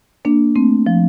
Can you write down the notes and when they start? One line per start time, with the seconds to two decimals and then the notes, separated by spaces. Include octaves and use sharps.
0.25 A#3 D4
0.56 A3 C4
0.87 F3